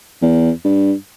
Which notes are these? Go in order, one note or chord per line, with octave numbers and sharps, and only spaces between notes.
E2
G2